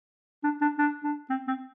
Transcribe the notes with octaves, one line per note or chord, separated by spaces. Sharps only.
D4
D4
D4
D4
C4
C4